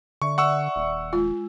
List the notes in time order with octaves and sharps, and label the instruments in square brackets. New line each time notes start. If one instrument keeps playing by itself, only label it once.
[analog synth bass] D3 [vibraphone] D5 E5 [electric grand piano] C#6
[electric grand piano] F#5 C#6 E6
[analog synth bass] D#1
[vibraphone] G#3 [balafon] F4